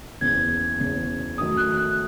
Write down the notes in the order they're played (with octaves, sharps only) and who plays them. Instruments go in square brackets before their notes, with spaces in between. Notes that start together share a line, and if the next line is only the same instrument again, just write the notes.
[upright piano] F#1 E2 C#3 [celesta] G#6
[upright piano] F#1 E2 C#3
[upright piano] F#2 D#3 F#3 A3 [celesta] D#6
[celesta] F#6
F#6